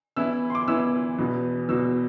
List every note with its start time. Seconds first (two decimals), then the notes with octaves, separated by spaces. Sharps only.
0.16 E3 B3 E4 E6
0.50 C6
0.55 D6
0.68 E3 B3 E4 E6
1.18 E2 B2 B3
1.68 E2 B2 B3 E6